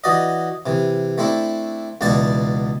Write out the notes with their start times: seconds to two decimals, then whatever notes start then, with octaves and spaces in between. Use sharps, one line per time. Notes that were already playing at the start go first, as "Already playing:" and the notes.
0.04 E3 F#4 D5 D#5
0.66 C3 E3
1.18 A3 C4 D4 E4
2.01 C#2 B2 E3 D4 D5 A5